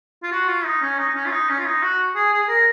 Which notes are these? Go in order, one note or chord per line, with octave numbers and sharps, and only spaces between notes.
F4
F#4
F4
D#4
C#4
D#4
D#4
C#4
F4
D#4
C#4
F4
D#4
F#4
G#4
G#4
G#4
A#4